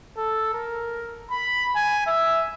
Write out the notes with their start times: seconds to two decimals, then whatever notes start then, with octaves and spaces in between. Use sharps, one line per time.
0.17 A4
0.54 A#4
1.31 B5
1.76 G#5
2.07 E5